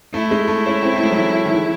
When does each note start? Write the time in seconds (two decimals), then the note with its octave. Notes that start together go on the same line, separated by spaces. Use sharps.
0.14 A3 E4
0.31 G#3
0.48 A3
0.66 C#4
0.83 C4
0.96 A3
1.03 G#3
1.11 F#3
1.18 E3
1.45 D#3
1.53 E3